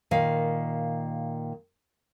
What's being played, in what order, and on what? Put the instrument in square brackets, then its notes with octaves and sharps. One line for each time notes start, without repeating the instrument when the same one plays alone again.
[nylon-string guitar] A#2 D#3 F5